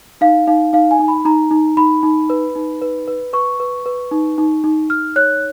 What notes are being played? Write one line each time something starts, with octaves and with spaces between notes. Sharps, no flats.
D#4 F5
D#4 F5
D#4 F5
G#5
D#4
B5
D#4 A#5
D#4
D#4 B5
D#4
B4
D#4
B4
B4
B4 C#6
B4
B4
D#4
D#4
D#4
D#4 F6
C#5 F#6